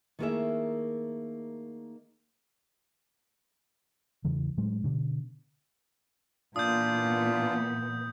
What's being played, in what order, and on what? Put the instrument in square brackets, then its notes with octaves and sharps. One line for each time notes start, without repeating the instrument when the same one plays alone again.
[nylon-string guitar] D#3 A3 A#3 E4 G#4 E5
[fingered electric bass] E2 C#3 E3
A2 F#3 G#3
B2 D3
[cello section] A#2 E3 B3 [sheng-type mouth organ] D4 F4 [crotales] D#6 G6